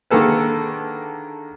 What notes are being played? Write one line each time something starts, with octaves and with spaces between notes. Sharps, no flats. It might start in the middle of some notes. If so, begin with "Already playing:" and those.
D3 D#3 G#3 A#3 A4 B4